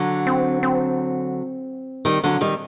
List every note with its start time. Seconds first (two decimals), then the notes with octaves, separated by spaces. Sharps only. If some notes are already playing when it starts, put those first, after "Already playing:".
Already playing: D3 F#3
0.27 C4
0.63 C4
2.05 D#3 G3
2.24 D3 F#3
2.41 D#3 G3